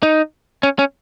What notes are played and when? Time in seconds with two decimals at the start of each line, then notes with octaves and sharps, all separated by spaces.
0.03 D#4
0.63 C#4
0.79 C#4